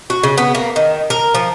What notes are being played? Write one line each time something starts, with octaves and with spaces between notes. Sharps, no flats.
F#4
C#3
B3
A#3
D#3
A#4
F3